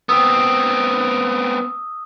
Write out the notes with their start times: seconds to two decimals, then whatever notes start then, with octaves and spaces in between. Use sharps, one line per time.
0.09 B3 C4 D#6 E6